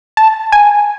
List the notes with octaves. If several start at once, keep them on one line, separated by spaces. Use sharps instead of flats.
A5
G#5